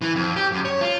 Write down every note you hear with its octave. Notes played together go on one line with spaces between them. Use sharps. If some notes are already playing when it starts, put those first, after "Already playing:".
E3
F2
G4
F#2
C#5
F4